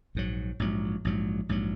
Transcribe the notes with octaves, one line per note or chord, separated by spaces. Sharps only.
A#1 G#2 F#3
A#1 G#2 F#3
A#1 G#2 F#3
A#1 G#2 F#3